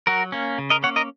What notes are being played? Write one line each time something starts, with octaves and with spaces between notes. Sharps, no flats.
F#3 F#4 A#4
A#3 C#4
C#3
A#4 D#5
A#3 C#4 C#5 F#5
A#4 D#5